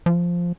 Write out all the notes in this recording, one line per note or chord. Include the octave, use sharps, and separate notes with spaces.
F3